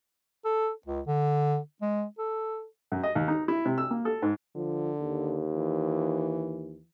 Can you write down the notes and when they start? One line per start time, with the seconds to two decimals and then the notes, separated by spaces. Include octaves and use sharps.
0.45 A4
0.86 C#2
1.07 D3
1.82 G#3
2.19 A4
2.92 F#2
3.03 D#5
3.15 D#2
3.28 D#4
3.48 E4
3.66 C3
3.78 E6
3.91 A#3
4.05 A4
4.22 G#2
4.56 D3 F3
5.01 D#2
5.55 E3